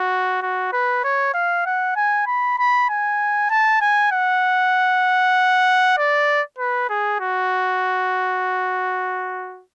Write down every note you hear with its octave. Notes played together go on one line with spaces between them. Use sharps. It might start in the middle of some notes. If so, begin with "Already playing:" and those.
Already playing: F#4
F#4
B4
C#5
F5
F#5
G#5
B5
B5
G#5
A5
G#5
F#5
D5
B4
G#4
F#4